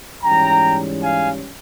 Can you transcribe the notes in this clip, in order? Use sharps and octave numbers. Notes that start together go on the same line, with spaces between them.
G#2 E3 G3 C#4 G5 A#5
F5 G#5